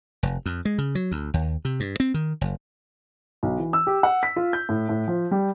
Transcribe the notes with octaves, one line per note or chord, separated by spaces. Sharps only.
F1
F2
G#3
C#3
F#3
D2
D#2
C3
G2
C4
D#3
F#1
B1
E3
E6
G4
F#5
B6
F4
G6
A2
A2
F3
G3